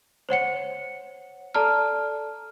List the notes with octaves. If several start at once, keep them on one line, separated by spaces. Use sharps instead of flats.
C5 C#5 F#5 C#7
A4 D5 A5 A#5 F6